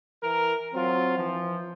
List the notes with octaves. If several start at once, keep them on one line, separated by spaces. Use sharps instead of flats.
E3 A#4
F#3 C4 F4
E3 F3